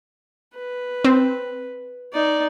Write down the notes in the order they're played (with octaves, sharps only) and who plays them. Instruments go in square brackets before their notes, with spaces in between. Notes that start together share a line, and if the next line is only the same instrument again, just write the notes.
[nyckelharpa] B4
[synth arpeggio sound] C4
[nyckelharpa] D#4 D5